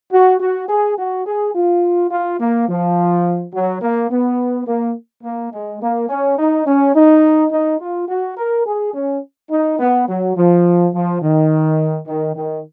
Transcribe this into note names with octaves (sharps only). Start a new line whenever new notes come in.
F#4
F#4
G#4
F#4
G#4
F4
F4
A#3
F3
F#3
A#3
B3
A#3
A#3
G#3
A#3
C#4
D#4
C#4
D#4
D#4
F4
F#4
A#4
G#4
C#4
D#4
B3
F#3
F3
F3
D#3
D#3
D#3